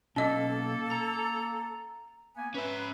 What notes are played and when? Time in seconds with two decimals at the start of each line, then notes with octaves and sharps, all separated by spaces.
0.16 B1 A#3 C#4 A4 D#5
0.91 A#5
2.36 A#3 B3 G#5
2.55 C#4 B4 E5